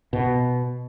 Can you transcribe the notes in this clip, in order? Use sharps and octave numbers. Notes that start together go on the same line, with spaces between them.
B2